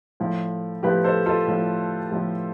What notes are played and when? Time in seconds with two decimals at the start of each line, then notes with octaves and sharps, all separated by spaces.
0.20 A2 F3
0.83 A2 F3 G4 B4
1.04 A4 C5
1.26 F4 A4
1.47 A2 F3
2.11 A2 F3